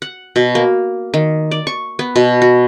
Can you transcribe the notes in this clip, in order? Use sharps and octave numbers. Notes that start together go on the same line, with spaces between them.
F#5
B2
A#3
D#3
D5
C#6
B3
B2
F#4